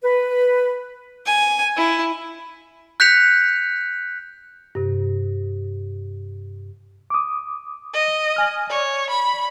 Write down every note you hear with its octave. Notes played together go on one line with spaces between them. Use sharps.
B4
G#5
E4
F#6 G6 B6 C#7 F7
G2 C3
D6 D#6
D#5
G#5 F6
C#5 D5
B5